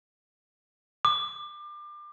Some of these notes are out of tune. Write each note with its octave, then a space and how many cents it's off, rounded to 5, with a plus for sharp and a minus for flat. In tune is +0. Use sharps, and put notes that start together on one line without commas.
D6 +30